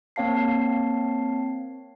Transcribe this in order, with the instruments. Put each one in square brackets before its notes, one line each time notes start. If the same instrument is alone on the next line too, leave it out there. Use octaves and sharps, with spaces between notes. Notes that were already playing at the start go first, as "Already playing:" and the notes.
[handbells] A#3 C4 C#5 F5 A5 C7